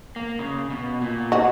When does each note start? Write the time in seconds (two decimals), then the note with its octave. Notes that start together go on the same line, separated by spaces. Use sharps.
0.16 A#3
0.39 C#3
0.70 B2
1.01 A#2
1.32 D#4 F#4